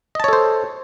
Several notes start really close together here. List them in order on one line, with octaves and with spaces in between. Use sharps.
D#5 A5 C#5 A4 C5